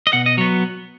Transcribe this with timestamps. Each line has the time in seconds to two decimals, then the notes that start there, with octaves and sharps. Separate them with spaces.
0.07 D#5
0.13 B2 F#5
0.26 D#5
0.38 F#3 B3 C#5